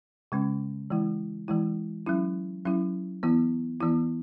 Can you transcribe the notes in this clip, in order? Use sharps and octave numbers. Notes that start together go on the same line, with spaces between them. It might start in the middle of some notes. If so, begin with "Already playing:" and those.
C#3 G#3 C#4
E3 G#3 E4
E3 G#3 E4
F#3 C#4 E4
F#3 C#4 E4
E3 B3 E4
E3 B3 E4